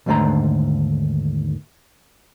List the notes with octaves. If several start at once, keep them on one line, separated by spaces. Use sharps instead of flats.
D#2 G#2 D3 A3 C5 A#5